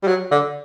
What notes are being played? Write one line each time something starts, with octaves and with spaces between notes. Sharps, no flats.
G3
F#3
D3